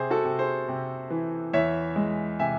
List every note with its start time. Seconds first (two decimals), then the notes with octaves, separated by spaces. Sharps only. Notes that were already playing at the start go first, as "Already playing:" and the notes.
Already playing: C3 G#4 C5
0.11 F#4 A4
0.25 C3
0.39 G#4 C5
0.68 C3
1.10 E3
1.53 E2 C#5 E5
1.96 G#3
2.39 C3 E5 G#5